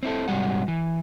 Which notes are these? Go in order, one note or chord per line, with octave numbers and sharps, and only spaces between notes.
C4 E4 A4
G#2 C3 F#3 G3 F#5
E3